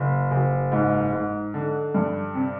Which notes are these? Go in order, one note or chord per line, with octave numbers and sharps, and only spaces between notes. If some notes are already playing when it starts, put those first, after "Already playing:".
Already playing: F#1
F#1
G#2
G#2
D3
G2
C3